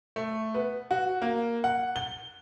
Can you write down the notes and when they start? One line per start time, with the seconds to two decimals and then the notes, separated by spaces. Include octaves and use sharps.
0.16 A3
0.54 B3
0.91 F#4
1.22 A#3
1.64 F#5
1.96 G7